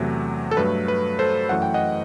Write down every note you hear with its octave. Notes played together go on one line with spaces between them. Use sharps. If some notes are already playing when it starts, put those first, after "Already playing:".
Already playing: E2 C3 F#3 A3
A4
G2 F#3 A3 B4
B4
A4 C5
F#2 E3 A3 F#5
G5
D#5 F#5